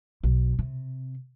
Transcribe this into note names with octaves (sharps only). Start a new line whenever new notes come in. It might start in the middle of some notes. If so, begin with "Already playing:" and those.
B1
C3